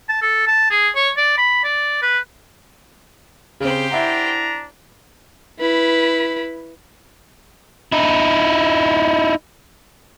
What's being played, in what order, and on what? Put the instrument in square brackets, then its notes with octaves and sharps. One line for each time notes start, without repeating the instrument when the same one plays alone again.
[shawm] A5
A4
A5
G#4
C#5
D5
B5
D5
B4
[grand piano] C#3 C4 [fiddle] G4 C5
[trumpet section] D4 A#5 [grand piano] E4 E5 F#5
[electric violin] E4 B4
[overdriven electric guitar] D#4 E4